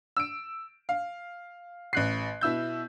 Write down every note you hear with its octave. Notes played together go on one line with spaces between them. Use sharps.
E6 D7
F5
A1 F#6 C7
B2 E4 E6 G6